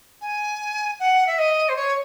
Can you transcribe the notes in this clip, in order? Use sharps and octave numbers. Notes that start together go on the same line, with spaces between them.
G#5
F#5
E5
D#5
C5
C#5